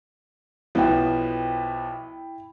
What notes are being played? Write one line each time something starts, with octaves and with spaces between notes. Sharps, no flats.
B1 F3 B3 E4 G5